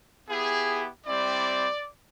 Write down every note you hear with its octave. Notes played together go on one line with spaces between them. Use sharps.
B3 E4 G4 G#4
G3 C4 E4 D5